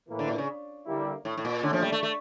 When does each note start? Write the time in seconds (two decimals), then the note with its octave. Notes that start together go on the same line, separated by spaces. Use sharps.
0.09 A2 E3 A#3
0.19 D3
0.28 A#2
0.38 C#3
0.86 D3 G3 A#3 E4
1.25 A2
1.37 A2
1.45 A#2
1.63 A#2 D3 A3 C#4
1.73 F3
1.82 G3
1.92 A3
2.03 A3